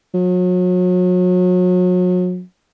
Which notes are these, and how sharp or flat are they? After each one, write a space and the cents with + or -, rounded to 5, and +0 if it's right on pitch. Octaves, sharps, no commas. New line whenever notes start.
F#3 -35